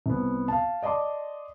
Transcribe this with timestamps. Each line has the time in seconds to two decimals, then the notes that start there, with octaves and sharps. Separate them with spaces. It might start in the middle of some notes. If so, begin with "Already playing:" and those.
0.06 C2 B3
0.48 F5 A5
0.83 D5 D#5 A5 C6 D6